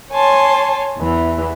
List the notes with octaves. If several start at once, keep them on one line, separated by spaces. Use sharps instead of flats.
C#5 G#5 A5 C6
E2 E3